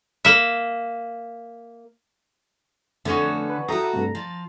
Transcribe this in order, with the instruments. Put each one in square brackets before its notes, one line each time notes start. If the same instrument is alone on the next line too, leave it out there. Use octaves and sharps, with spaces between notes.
[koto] A#3 E5
[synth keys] F2 A3 [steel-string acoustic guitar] D3 A4 [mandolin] B3 C#4 F#4
[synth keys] B4
[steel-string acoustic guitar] F#4 A4 [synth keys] E5 G5 D#6 [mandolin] A#5
[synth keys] G2 C3 A3
[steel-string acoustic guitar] F3 [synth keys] A6